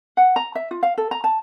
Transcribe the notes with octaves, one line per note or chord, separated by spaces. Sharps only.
F#5
A#5
E5
F4
F5
A4
A#5
A5